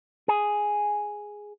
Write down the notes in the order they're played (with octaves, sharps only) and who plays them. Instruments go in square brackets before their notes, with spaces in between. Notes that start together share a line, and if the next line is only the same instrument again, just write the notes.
[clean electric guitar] G#4